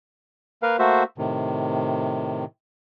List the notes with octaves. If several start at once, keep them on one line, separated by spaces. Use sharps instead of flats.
A#3 A#4 B4 F5
A3 A#3 F#4 C5 E5
A2 C3 D#3